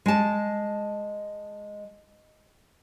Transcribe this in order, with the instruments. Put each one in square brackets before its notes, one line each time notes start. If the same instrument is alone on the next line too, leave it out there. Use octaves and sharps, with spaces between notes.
[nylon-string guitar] G#3 A5